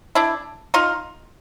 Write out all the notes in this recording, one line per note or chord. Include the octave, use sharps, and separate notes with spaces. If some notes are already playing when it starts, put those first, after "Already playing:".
D4 E4
D#4 F4